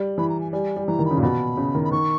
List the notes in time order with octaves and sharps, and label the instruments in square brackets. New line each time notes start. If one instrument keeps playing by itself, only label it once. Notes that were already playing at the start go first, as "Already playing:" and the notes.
Already playing: [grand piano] G3
[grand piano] E3 [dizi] B5
[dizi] A#5
G#5
[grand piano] G3 [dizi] G#5
[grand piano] G3
[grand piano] E3 [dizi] A#5
[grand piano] D#3
[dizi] B5
[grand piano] C#3
A#2
[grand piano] B2 [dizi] B5
[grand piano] C#3
D#3
[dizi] B5
[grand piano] D#3 [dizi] C#6